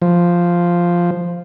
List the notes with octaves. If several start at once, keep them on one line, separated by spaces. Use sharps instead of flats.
F3